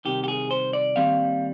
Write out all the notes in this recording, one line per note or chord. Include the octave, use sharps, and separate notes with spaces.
C2 C3 D#3 G4
G4
G#4
C5
D5
D#2 D#3 G3 C4 F5